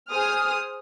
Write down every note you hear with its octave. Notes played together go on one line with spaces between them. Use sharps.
G#4 C5 D#6 F6